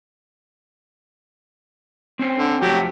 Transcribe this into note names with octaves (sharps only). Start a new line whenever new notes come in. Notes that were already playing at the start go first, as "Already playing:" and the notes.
C4 C#4 C5
D3
F2 F#3 A3 G4